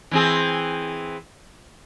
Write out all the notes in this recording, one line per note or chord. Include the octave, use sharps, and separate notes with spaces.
E3 C4 G#4